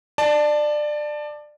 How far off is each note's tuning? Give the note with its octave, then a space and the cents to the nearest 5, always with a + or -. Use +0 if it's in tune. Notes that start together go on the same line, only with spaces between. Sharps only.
D5 +20 A5 +0